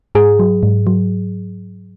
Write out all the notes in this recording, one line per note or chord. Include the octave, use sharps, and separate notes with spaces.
G#2 G#4
F#3
G#2
F#3